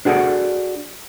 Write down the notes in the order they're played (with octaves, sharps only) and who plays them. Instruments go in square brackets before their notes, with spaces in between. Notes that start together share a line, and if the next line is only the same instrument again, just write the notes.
[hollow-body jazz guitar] D4 F#4 G#4 A4 D5